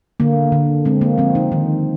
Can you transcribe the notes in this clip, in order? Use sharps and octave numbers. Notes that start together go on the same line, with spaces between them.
D3 A#3
D3
G#3 C4
A#3
F3 C4
D#4
D#3